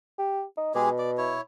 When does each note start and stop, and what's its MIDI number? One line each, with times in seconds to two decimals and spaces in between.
0.18 0.43 67
0.57 0.75 63
0.75 1.36 47
0.75 0.89 56
0.75 0.89 67
0.75 0.89 68
0.99 1.11 74
1.18 1.41 64
1.18 1.41 73